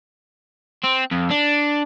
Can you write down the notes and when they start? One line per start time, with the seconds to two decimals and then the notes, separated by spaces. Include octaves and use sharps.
0.84 C4
1.12 F2
1.31 D4